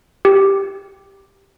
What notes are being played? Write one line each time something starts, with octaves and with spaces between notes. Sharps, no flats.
G4